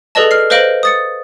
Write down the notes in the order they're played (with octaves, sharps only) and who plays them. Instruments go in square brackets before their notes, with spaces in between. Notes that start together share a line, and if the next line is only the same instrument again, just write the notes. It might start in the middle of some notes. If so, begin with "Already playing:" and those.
[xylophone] G#4 A4 B4 D5 D#5 A5
F6 C7
B4 C5 D#5 F5 D7 F#7
D#6 A6 C#7